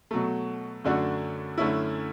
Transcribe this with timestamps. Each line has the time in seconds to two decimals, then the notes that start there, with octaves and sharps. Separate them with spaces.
0.11 B2 F#3 A3
0.84 F#2 D3 A3 D4 F#4
1.58 F#2 D3 A3 C#4 E4